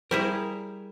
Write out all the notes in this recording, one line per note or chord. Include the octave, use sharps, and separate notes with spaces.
G3 E4 G#4 A#4